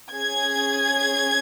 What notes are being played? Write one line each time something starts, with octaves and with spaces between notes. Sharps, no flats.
C#4 G#4 G#6